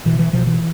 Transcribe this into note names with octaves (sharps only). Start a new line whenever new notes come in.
B2 E3
E3
B2 F3
E3